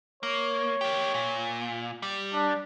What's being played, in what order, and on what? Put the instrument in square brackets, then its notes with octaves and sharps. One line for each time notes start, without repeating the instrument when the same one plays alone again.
[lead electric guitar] A#3 [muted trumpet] C#5
[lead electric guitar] A#3 G4
A#2
G3
[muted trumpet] D4